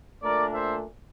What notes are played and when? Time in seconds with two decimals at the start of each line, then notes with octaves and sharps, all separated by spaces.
0.22 A#2 A3 D4 A#4 D5
0.53 C5 E5